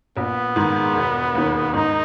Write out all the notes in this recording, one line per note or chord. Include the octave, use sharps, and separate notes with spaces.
A#1 B3
G#2 D#3
E1
D#2 D#3
G#2 D#4